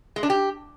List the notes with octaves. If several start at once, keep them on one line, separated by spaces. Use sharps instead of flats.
G#3
D4
G4